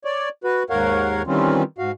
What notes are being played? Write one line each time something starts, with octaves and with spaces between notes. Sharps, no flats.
C#5 D5
F#4 B4
D#2 G#2 A#4 C#5 F5 F#5
D#3 E3 G3 C4 C#4 F4
G#2 F#4 F5